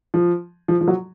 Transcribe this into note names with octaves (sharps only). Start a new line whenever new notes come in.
F3
F3
F3
F#3